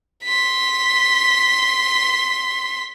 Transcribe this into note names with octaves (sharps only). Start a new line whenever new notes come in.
C6 B6